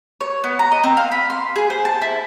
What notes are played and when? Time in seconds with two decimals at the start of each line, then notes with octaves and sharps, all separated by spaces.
0.21 C#5
0.44 B3
0.59 A#5
0.72 D#5
0.84 C4
0.97 F5
1.12 B5
1.30 C6
1.56 G#4
1.70 C5
1.85 A5
2.02 E4